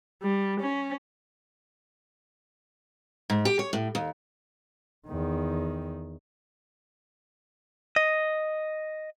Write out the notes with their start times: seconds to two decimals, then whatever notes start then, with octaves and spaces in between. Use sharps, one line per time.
0.23 G3
0.61 C#4
3.30 G#2
3.45 G4
3.59 C#5
3.73 A2
3.95 D#2
5.08 E2 D#3
7.96 D#5